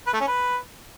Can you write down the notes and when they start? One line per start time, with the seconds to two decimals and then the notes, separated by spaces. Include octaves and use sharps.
0.07 B4
0.14 A3
0.20 C#4
0.27 B4